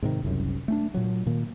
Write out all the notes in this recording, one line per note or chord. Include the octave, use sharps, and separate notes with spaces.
G#2 C3 D#3
F#1 C2 F#2
A3 C#4 D4
A#2 F#3
A#2 D#3 A#3